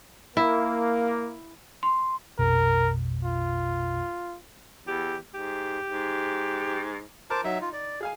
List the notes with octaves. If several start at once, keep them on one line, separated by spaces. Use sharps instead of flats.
A#3 E4
C6
A#1 F2 B2 A#4
F4
E2 G4
G#2 G4
G#2
A#4 C5 A5 D6
F#3 D#4 E5
F4
D5
G#4 F5 G#5